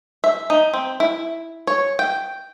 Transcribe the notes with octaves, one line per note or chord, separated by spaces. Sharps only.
E5
D#4
C4
E4
C#5
G5